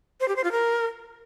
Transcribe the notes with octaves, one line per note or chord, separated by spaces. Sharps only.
C5
G4
C5
F4
A#4